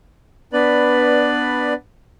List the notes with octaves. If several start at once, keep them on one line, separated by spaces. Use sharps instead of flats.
B3 D4 B4 D5 B5